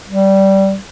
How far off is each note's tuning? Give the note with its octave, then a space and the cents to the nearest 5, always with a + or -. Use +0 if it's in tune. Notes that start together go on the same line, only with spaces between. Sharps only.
G3 -15